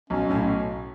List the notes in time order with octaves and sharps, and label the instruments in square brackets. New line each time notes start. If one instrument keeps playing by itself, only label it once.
[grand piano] B1 [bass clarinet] C#4
[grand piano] A2 [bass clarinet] C#4